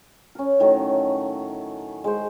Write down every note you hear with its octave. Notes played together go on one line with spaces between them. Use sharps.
C#4 A#4
A2 D#3 F#3 A3
G#3 C5